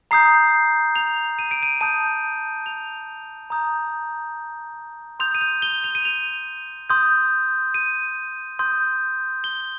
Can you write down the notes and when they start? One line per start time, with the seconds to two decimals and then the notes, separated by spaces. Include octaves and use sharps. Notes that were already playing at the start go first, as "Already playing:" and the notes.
0.11 A#5 D#6 G6 C7
0.96 F7
1.39 D#7
1.51 D7
1.63 D#7
1.81 A5 D#6 G6 D#7
2.66 F7
3.50 A#5 D#6 G6
5.20 C6 D#6 G6 F7
5.35 D#7
5.41 F7
5.62 G7
5.84 F7
5.95 D#7
6.05 F7
6.90 C6 D#6 G6
7.74 D#7
8.59 C6 D#6 G6
9.44 G7